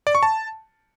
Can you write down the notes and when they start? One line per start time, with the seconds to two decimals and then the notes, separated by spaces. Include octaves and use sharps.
0.07 D5
0.15 C#6
0.23 A5